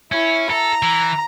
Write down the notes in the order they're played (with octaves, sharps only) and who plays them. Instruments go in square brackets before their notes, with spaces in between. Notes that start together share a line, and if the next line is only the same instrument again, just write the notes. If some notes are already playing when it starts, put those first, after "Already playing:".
[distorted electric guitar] C#4 [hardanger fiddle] E4
[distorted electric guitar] A4 [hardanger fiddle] A#5
[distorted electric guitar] E3